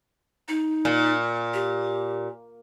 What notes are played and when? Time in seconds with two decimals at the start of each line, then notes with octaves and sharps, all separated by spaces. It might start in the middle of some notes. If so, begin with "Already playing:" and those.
0.48 D#4
0.85 A#2
1.54 G4